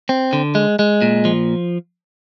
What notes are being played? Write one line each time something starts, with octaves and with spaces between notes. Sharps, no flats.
C4
D3
G#3
G#3
A#2
F3